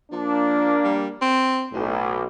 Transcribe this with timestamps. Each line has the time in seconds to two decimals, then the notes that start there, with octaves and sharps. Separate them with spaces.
0.12 F3 A#3 D4
0.84 G3
1.22 C4
1.73 B1 A2